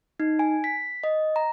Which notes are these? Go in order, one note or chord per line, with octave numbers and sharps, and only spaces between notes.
D#4
G#5
B6
D#5
A#5